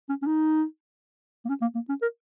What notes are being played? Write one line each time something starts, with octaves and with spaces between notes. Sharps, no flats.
C#4
C#4
D#4
A#3
C#4
A#3
A#3
C#4
A#4